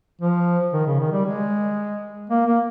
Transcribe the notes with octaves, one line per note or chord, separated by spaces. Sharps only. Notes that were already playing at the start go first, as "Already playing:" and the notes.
F3
D#3
C#3
D#3
G3
G#3
A#3
A#3